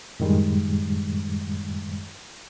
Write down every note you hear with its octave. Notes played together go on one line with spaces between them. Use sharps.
F#2 A2 D#3 G3 G#3